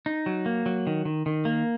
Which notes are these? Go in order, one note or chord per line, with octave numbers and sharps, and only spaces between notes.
D#4
F#3
A#3
F#3
D#3
D#3
D#3
A#3